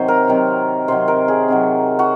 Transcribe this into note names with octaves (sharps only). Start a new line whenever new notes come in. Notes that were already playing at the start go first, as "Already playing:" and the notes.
Already playing: C3 D#3 F#3 C5
A#4
C3 D#3 F#3
C3 D#3 F#3 C5
A#4
G#4
C3 D#3 F#3
F#4